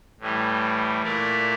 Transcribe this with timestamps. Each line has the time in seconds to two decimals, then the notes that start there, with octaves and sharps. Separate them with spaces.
0.20 A2 E3 G3
1.02 A#2 A3 E4 A#4 D5